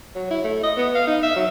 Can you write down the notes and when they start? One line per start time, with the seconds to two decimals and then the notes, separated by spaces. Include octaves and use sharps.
0.15 F#3
0.31 E4
0.44 A3
0.63 D#5
0.77 B3
0.95 F5
1.07 D#4
1.23 E5
1.36 F#3